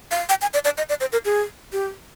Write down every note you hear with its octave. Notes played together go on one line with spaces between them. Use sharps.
F5
G5
G#5
D5
D5
D#5
D5
C5
A#4
G#4
G4